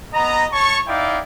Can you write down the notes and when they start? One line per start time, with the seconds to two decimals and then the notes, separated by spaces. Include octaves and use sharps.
0.14 B3 D#5 A#5
0.53 C#5 A5 C#6
0.88 D#4 E4 D5 F5 G5